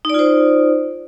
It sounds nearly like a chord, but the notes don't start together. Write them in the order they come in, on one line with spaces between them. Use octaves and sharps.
D#4 D5 F4 C5